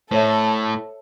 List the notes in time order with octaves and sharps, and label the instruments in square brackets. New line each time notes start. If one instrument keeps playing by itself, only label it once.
[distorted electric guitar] A2 [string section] A4 [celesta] C5 C#5 E5